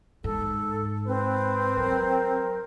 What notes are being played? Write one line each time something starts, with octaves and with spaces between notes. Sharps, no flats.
G#2 A4
C4 B4
F#3 A#4